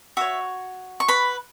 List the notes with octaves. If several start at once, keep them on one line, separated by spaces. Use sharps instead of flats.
F#4 C#5 E5
C#6
B4 B5